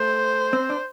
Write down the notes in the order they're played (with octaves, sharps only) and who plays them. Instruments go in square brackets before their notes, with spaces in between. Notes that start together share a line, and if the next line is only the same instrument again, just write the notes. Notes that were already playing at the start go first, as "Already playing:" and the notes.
Already playing: [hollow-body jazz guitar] A3 [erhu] C5
[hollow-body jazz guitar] C4
D4